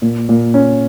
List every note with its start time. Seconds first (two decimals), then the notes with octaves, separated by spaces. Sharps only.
0.02 A#2
0.29 A#2
0.54 C#4